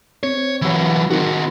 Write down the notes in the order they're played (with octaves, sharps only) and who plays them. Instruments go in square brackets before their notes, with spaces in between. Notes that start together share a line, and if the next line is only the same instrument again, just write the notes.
[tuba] C4 [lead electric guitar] C#5
[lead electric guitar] E3 F#3
[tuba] D#3 [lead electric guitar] C4 F#4